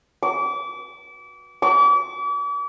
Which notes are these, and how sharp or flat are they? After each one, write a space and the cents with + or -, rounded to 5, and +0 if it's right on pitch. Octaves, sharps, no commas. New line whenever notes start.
D6 -30
D6 -40